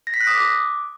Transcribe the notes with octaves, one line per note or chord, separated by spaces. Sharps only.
A#6
B6
F#6
D#6
D6